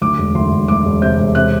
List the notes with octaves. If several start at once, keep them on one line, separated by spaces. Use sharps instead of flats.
D2 D6
E1
D2 C6
E1
D2 D6
E1
C3 G6
E1
C3 F#6